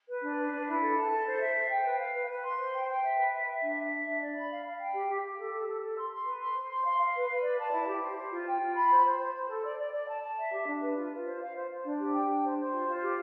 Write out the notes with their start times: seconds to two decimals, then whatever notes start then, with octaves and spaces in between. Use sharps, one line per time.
0.08 B4
0.23 D4
0.37 B4
0.52 D4
0.67 E4
0.81 A4
0.96 A5
1.11 A4
1.25 C5
1.40 E5
1.55 C5
1.69 G5
1.84 B4
1.99 F5
2.13 B4
2.29 B4
2.43 C6
2.58 C5
2.72 G5
2.87 G5
3.02 E5
3.16 B4
3.31 E5
3.46 E5
3.61 D4
3.75 E5
3.90 E5
4.05 D4
4.19 D5
4.34 B5
4.49 F5
4.64 F5
4.79 G5
4.93 G4
5.07 G4
5.22 G4
5.37 A4
5.52 A4
5.66 A4
5.81 A4
5.95 C6
6.10 C6
6.25 B4
6.40 C6
6.54 C5
6.69 C6
6.84 F5
6.98 F5
7.13 B4
7.28 B4
7.42 D5
7.57 A5
7.72 E4
7.87 G4
8.01 C5
8.16 C5
8.31 F4
8.45 G5
8.60 F4
8.75 B5
8.89 C5
9.04 C5
9.19 C5
9.34 C5
9.48 A4
9.63 D5
9.77 D5
9.92 D5
10.07 A5
10.22 A5
10.37 E5
10.51 G4
10.66 D4
10.80 B4
10.95 F4
11.10 F4
11.24 C5
11.39 F5
11.54 C5
11.69 C5
11.83 D4
11.99 G4
12.12 G5
12.28 D4
12.43 C5
12.57 C5
12.72 F4
12.87 F4
13.01 G4